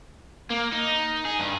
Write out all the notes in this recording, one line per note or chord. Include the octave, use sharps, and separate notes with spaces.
A#3
D#4
G#4
G2